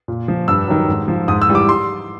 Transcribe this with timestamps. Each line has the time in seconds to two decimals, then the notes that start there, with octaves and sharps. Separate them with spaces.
0.08 A#2
0.28 F3
0.48 G2 E6
0.67 D#3 F#3
0.89 G#2
1.08 F3
1.28 G#2 D#6
1.42 E6
1.48 E3 G3
1.55 D6
1.69 C6